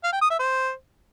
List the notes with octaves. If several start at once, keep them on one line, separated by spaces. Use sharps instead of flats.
F5
G5
D#6
E5
C5